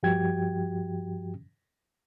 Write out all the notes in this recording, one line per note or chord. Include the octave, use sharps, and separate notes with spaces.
G2 F3 F#4 G4 G5 G#6